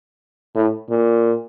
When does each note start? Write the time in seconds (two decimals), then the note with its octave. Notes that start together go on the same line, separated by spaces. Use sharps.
0.55 A2
0.90 A#2